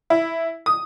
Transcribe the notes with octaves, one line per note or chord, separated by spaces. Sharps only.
E4
D#6